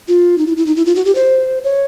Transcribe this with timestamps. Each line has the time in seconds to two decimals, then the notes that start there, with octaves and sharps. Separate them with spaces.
0.08 F4
0.38 D#4
0.47 E4
0.57 E4
0.66 D#4
0.76 E4
0.86 F4
0.96 F#4
1.05 G4
1.15 C5
1.64 C#5